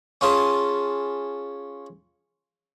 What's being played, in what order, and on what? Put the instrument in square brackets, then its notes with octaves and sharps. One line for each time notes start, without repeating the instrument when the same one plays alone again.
[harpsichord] C#4 F4 G#4 A5